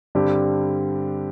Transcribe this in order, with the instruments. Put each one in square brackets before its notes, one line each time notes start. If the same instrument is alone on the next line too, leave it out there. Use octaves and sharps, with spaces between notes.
[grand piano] G2 D3 G3 C4 G4